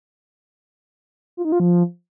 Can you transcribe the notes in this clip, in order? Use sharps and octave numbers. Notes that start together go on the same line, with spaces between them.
F4
D#4
F4
F3